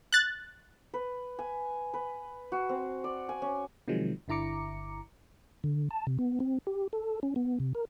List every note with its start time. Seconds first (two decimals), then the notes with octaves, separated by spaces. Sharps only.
0.13 F#6 A6
0.94 B4
1.39 G#5
1.94 B4
2.52 F#4
2.69 C4
3.04 D5
3.29 G#5
3.42 C#4
3.88 C3 D#3 F3 F#3 G#3
4.28 G1 D3 E4 A#5 D6 C#7
5.64 D3
5.91 A5
6.07 C3
6.19 B3
6.40 C4
6.67 G4
6.93 A4
7.23 C#4
7.36 B3
7.60 C3
7.75 A#4